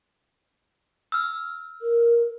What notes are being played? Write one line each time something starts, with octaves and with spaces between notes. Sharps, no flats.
E6 F6
A#4